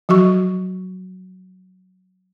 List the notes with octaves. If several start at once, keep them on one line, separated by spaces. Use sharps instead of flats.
F3 F#3 F#4 C#6